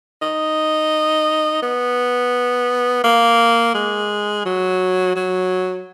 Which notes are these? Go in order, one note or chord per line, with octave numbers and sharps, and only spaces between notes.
D#4
B3
A#3
G#3
F#3
F#3